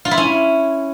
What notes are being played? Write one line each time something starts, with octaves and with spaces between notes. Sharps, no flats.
F4
E4
C#4